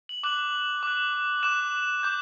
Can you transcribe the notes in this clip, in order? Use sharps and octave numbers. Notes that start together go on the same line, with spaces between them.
F#7
D6 F#6 F#7
D6 F#6
D6 F#6 E7
D6 G6